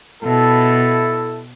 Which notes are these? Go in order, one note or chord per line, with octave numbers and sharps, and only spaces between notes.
B2 E4 A4